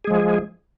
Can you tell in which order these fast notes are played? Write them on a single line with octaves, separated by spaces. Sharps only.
G#4 G#3 F3